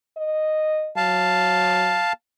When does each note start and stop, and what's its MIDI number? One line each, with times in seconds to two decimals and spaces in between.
0.17 0.90 75
0.97 2.05 54
0.97 2.13 77
0.97 2.13 81